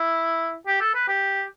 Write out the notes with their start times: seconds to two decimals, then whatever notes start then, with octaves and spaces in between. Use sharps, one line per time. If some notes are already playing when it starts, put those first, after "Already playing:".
Already playing: E4
0.67 G4
0.81 A4
0.95 B4
1.08 G4